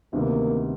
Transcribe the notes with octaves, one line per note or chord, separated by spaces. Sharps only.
D2 C3 D#3 G3 A#3 B3